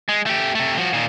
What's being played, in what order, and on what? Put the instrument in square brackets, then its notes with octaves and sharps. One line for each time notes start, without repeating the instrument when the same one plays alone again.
[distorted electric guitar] G#3
A3 G4
C3 A3
F3 F#4
A#2 D#3